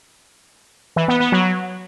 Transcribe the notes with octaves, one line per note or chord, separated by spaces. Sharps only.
E3
B3
B3
F#3